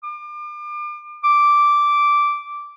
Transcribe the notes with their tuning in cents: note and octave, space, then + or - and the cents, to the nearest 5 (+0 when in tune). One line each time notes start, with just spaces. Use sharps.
D6 +35
D6 -5